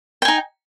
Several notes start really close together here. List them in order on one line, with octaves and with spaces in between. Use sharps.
G5 G#5 D#4